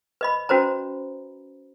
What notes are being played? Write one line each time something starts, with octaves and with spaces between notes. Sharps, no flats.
B4 D#5 B5
C#4 F#4 B4 C5 A#5